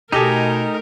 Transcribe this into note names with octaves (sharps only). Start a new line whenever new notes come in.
B2 A3 D#4 G4 A4 A#4 D#5 G#5